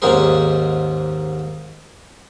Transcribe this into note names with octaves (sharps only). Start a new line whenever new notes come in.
D#2 G#2 A#3 C#4 G#4 C5